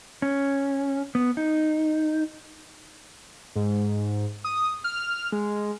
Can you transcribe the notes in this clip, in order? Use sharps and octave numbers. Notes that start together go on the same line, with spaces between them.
C#4
B3
D#4
G#2
D#6
F6
G#3